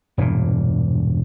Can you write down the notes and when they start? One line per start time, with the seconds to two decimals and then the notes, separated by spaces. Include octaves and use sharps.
0.18 E1 G2 A#2